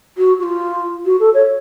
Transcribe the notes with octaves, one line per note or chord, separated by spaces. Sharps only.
F#4
F#4
F4
F#4
A4
C#5